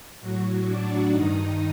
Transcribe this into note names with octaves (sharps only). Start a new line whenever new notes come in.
A2 F#3 F#4
D4 D5
G2 D#3 D#4 D#5